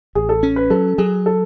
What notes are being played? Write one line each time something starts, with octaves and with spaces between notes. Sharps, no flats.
A1 G#4
A4
C#4
B4
F#3 A4
F#3 G#4
A4